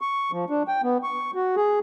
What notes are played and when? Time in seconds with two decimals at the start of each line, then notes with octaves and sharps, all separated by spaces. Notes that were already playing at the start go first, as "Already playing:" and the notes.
0.01 C#6
0.32 F3
0.50 D4
0.68 G5
0.83 B3
1.03 C#6
1.35 F#4
1.56 G#4